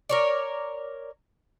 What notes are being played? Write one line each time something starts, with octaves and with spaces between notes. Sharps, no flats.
A#4 C#5 D5